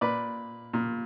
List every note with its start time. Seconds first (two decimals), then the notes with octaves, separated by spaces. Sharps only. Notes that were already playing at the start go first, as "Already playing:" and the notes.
0.01 A#2 B4 D5
0.74 A#2